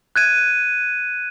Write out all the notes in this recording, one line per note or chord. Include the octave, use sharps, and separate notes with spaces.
F#6 G#6 D#7